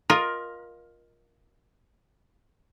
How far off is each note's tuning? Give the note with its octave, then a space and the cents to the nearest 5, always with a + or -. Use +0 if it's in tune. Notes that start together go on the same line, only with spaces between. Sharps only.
F4 +10 A#4 +15 D#5 +0